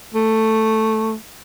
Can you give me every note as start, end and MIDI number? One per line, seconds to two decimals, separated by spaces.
0.14 1.15 57